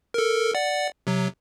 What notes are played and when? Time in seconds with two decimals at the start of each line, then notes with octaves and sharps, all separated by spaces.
0.14 A4 A#4
0.55 D5 F#5
1.07 C3 F#3